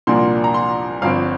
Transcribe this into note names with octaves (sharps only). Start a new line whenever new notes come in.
C2 A#2 F3 A#3 D4 C6
A#5
C6
G1 G2 F3 C4 F5